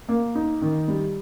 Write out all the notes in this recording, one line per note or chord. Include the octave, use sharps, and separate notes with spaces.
A#3
D#4
D#3
G3